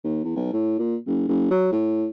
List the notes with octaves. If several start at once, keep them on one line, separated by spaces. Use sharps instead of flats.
D#2
E2
B1
A2
A#2
F#1
F#1
F#3
A2